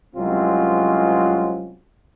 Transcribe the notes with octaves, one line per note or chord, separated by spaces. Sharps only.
C2 F#3 G#3 C4 C#4 F4